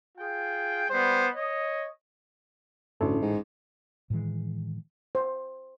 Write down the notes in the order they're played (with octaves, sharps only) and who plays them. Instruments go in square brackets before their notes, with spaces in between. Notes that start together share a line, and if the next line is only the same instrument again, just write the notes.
[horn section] F4 G#4 G5
G3 B3 C5
C#5 D#5
[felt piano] A1 [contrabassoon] D2 [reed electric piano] C#4 E4 A4
[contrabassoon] G#2
[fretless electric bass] A2 D#3 E3 G#3
[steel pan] C5